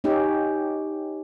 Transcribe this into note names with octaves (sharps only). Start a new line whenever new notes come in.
C#4 D#4 G4